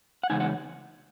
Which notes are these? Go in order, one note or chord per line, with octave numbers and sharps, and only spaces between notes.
F#5
E2 C#3 G#3 D#4 G#5
F#5